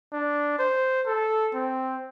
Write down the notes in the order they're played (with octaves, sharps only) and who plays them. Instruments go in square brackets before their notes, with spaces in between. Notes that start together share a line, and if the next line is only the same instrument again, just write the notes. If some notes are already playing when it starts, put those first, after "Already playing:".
[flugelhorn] D4
C5
A4
C4